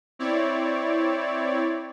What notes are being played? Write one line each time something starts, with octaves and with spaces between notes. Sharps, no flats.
C4 E4 C#5 D5